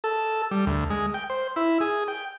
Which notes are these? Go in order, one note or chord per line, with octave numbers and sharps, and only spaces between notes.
A4
G3
D2
G#3
G5
C5
E4
G#4
G5